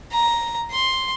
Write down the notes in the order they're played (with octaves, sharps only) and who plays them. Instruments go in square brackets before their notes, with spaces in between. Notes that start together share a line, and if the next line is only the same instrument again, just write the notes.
[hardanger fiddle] A#5
C6